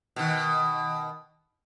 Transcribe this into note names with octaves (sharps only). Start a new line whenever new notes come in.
B2 D#3